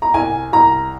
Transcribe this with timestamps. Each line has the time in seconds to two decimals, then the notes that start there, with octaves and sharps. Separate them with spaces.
0.02 A#5
0.14 C2 G#5
0.52 C2 A#5